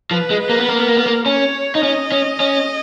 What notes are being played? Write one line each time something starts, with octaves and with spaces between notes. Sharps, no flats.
F3 B4
G#3
B4
A#3
B3
A#3 A#4
B3
A#3
B3
A#3
C#4 C#5
D#4
C#4 D#5
C#4
C#4